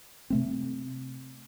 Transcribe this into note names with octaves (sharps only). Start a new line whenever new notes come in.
C3 A3 C4